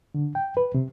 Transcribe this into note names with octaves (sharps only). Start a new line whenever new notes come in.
D3
G5
B4
C3